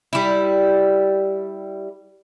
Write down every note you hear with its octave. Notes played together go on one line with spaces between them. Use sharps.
G3 E4